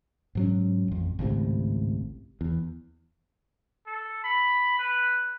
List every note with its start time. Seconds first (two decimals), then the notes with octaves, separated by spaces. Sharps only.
0.35 G#2 F#3 C#4
0.88 A1 F2
1.19 G#1 C#2 A2 C3
2.41 E2
3.86 A4
4.24 B5
4.78 B4